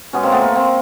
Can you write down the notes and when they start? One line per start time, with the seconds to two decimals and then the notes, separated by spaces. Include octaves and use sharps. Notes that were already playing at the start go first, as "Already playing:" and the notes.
0.13 B2 G#3 B3 C#4
0.23 A#3 C4
0.32 A3 B3
0.42 A#3
0.56 A#3 C4